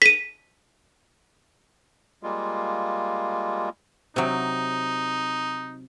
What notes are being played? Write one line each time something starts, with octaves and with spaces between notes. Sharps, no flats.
B6 D#7
G3 G#3 A#3 F4
C3 F#3 D#4